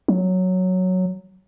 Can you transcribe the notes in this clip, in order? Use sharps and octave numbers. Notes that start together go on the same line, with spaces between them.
F#3